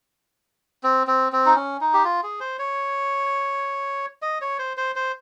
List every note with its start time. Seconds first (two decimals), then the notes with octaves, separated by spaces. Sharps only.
0.83 C4
1.07 C4
1.32 C4
1.46 D#4
1.55 C#4
1.81 D#4
1.94 G4
2.04 F4
2.23 G#4
2.40 C5
2.59 C#5
4.22 D#5
4.41 C#5
4.59 C5
4.77 C5
4.96 C5